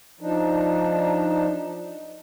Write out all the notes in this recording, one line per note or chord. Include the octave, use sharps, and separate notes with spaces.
F3 D4 D#4